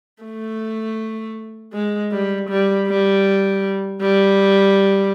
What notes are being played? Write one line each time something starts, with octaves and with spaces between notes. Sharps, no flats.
A3
G#3
G3
G3
G3
G3